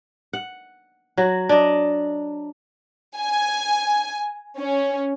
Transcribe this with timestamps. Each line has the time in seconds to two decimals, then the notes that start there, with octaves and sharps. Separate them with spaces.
0.33 F#5
1.17 F#3 F#4
1.49 D4 D#5
3.18 G#5
4.59 C#4